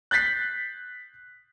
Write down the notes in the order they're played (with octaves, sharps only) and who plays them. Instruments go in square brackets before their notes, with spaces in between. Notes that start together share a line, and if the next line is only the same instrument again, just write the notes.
[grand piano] F#6 G6 A6 B6 C7